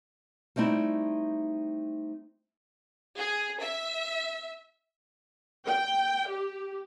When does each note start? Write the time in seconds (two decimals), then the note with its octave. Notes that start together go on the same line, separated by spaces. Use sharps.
0.56 G3 A3 C4 D#4 E4
3.16 G#4
3.61 E5
5.66 G5
6.27 G4